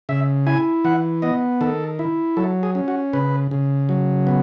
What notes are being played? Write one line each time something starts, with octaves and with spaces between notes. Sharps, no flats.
C#3 E5
E4 G#5
E3 F#5
B3 D#5
D#3 A4
E4
F#3 A4
G#4
C#4
F#4
C#3 B4
C#3
F#3
B3